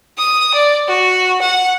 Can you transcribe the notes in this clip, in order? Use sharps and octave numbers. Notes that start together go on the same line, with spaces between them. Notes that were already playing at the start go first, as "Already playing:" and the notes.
D#6
D5
F#4
F#5